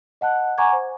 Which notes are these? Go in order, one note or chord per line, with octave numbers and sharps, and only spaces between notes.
D#5 F#5 A5 F#6
F#5 G#5 A#5 C#6 D6 G#6
C5